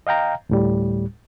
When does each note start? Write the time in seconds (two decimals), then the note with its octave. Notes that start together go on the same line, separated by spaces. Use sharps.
0.07 D#5 F5 G5 A#5
0.49 D2 A2 G3